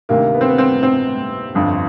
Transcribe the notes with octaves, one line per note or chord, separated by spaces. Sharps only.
D2 C3 D#3 A#3
B3
C4
B3
C4
C4
G1 F2 D3 F3